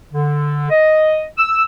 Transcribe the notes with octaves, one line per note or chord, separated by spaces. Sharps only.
D3
D#5
E6